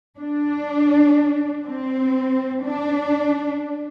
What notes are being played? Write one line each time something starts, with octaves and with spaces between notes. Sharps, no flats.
D4
C4
D4